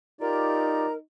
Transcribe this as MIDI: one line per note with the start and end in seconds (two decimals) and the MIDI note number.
0.21 1.01 63
0.21 0.86 65
0.21 0.86 67
0.21 0.97 70
0.21 0.86 74
0.21 0.92 82